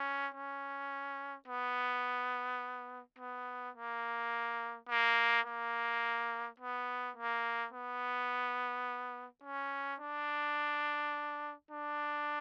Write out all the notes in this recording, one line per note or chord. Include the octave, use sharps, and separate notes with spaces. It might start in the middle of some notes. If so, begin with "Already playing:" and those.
Already playing: C#4
C#4
B3
B3
A#3
A#3
A#3
B3
A#3
B3
C#4
D4
D4